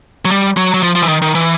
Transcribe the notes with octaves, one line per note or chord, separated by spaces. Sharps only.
F#3
G3
F#3
F#3
F3
F3
E3
D#3
D#3
E3